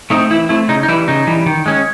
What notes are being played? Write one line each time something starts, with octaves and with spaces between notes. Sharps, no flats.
A3 C4 D#4
E3 E4
A3 C4 E4
C#3 D#4
D#4
E3 G3 E4
C#3 D#4
E3 G3
D#3
G#3 C#4